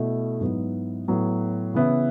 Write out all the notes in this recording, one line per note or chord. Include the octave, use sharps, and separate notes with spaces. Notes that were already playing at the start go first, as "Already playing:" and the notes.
Already playing: B2 A3 E4
G#2 F#3 B3 E4
A2 F#3 B3
C#3 E3 B3 E4